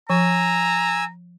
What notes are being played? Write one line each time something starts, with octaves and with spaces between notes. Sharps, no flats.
F3 G#5 A#5 E6